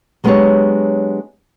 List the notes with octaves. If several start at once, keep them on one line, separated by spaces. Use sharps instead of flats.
F#3 G#3 B3 D4 G4 C#5